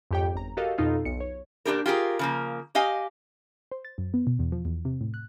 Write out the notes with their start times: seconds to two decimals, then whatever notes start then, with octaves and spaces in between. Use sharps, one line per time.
0.11 F2 G#2 G4 C#5 G5
0.35 G1 A#5
0.57 F#4 G4 A4 A#4 D#5 F5
0.78 F2 B2 D#4 F4 A4 F5
1.05 B1 C#7
1.20 C#5
1.65 A#2 F3 D4 G4 A#4
1.86 F4 G4 G#4 A#4
2.19 C#3 F3 A#3
2.75 G4 D#5 F5 G#5
3.72 C5
3.85 A6
3.98 F#2
4.14 B3
4.27 B2
4.39 E2
4.52 F3
4.65 E2
4.85 C3
5.01 A2
5.14 F#6